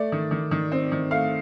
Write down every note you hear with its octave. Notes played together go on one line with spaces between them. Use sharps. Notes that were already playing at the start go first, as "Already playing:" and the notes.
Already playing: A3 D5
D#3
D#3
D#3
C4
D#3
A3 F5